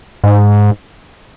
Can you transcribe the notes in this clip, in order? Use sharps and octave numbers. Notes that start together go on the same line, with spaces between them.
G#2